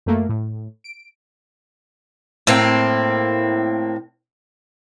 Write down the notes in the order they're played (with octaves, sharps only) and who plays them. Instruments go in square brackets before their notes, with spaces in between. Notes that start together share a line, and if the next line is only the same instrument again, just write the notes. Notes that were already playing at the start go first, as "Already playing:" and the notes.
[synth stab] F#2 A3 A#3
A2
D7
[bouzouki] A2 A#3 C4